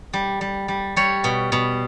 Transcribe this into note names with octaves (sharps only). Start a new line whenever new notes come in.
G3
G3
G3
G3 C#5
B2
B2